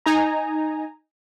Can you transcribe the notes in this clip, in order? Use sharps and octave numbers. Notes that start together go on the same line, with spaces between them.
D#4 G#5 A#5